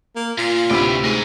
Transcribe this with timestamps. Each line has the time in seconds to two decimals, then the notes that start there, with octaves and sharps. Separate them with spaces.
0.16 A#3
0.38 A#2 F4
0.70 D2 A2 C3 B4 G5
1.04 G#2 A#4 G#5